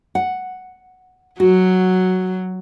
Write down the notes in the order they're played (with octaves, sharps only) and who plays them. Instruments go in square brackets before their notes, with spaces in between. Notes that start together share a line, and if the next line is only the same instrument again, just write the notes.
[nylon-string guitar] F#5
[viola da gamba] F#3 [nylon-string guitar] F#4